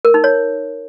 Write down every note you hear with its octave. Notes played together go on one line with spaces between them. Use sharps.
A#4
D#4
C#5